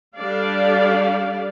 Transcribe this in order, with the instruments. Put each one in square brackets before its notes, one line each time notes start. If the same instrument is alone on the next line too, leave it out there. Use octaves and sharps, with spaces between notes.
[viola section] G3 D4 A4 D5 F5